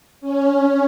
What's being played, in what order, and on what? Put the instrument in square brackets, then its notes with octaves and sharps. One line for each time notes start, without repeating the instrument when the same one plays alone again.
[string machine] C#4